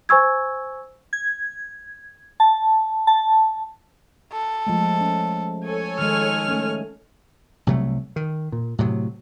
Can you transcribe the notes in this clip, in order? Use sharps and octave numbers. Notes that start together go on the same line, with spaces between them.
C5 G#5 C#6 E6 G#6
G#6
A5
A5
A4
F3 G#3 A3
C#4
A4 C#5 G#5
D#3 G#3 F6
A3 C#4
C2 C3 F#3 A3
D#3
A#2
A2 C3 F#3